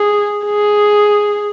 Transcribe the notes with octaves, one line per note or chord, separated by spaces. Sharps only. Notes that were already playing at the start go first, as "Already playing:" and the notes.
Already playing: G#4
G#4